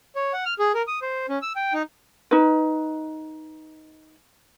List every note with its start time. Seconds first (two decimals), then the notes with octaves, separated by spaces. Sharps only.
0.16 C#5
0.33 F#5
0.45 F6
0.59 G#4
0.74 A#4
0.87 D#6
1.02 C5
1.29 C#4
1.42 E6
1.56 G5
1.73 D#4
2.31 D#4 B4